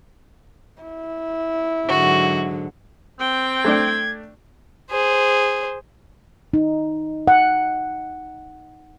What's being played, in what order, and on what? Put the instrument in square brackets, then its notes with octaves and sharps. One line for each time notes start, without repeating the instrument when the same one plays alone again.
[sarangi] E4
[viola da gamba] G#2 D3 F#3 [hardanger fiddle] F#4
[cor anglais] C4 [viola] G5
[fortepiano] A3 D4 D5 [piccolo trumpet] G#6
[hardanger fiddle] G#4 C5
[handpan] D#4
F#5